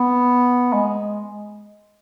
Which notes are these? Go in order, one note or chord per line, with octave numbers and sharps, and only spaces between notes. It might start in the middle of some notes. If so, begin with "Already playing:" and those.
Already playing: B3
G#3